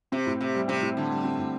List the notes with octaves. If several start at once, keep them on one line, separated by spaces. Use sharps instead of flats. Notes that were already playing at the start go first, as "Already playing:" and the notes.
C3 C4
A2
C3 E4
G3
C3 C4
A2
D3 E4
G3
C4
A2